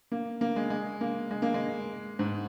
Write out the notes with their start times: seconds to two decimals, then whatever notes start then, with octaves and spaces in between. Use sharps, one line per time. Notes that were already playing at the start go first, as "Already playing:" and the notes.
0.12 A#3
0.41 A#3
0.56 G#3
0.70 G#3
1.01 A#3
1.31 G#3
1.42 A#3
1.54 G#3
2.19 G#2